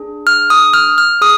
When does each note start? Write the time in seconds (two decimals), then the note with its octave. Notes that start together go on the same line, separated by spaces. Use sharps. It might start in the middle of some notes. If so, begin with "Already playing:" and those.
Already playing: D4 G#4
0.27 F6
0.50 D#6
0.73 F6
0.98 F6
1.21 G#4 D#6